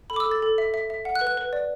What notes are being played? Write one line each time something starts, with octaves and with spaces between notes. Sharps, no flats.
A4 B5
D6
E6
A4
A6
A4
E5
E5
E5
F#5
F#6
B4
F#6
B4
D5